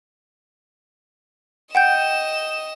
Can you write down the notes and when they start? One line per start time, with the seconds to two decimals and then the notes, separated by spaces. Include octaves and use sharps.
1.75 D#5 F#5 G5 G6 E7